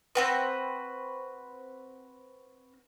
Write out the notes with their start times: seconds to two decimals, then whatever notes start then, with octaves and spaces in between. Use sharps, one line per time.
0.15 C4 F#4 B4